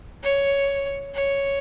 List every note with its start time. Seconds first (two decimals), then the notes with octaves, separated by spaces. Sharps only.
0.23 C#5
1.14 C#5